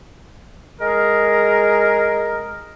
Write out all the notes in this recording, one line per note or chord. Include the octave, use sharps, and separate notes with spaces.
G#3 G#4 A#4